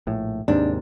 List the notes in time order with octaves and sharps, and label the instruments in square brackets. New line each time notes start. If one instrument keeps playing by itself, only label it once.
[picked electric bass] A#1 A2
[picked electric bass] D#2 G#2 C3 [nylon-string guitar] D4